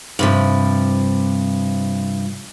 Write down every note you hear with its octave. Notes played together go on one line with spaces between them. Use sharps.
G2 C3 F3